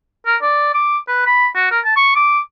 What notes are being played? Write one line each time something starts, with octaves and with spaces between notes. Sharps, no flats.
A#4
D5
D6
B4
B5
F#4
A#4
A5
C#6
D6